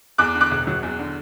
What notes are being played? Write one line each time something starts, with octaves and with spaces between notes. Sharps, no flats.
E2 D6 F#6
D3
D6 F#6
E1
F#3
E2
D3